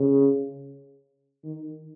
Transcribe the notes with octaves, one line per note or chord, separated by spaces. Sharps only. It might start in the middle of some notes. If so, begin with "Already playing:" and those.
Already playing: C#3
D#3